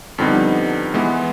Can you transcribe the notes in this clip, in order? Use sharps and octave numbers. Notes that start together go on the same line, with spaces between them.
F2 D3 G3 B3 D#4
E3 G#3 B3